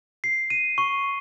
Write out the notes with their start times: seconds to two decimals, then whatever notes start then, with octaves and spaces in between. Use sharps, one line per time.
0.24 C7
0.50 D#7
0.78 C#6